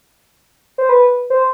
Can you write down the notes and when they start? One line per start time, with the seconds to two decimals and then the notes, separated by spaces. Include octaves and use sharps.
0.78 C5
0.89 B4
1.30 C5